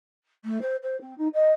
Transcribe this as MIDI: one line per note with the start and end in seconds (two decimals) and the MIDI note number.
0.44 0.58 57
0.61 0.76 72
0.82 0.99 72
1.01 1.17 60
1.17 1.27 63
1.34 1.51 75